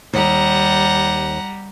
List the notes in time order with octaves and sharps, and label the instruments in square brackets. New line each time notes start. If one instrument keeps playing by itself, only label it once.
[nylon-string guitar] D#2 [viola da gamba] G3 [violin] F#5 A#5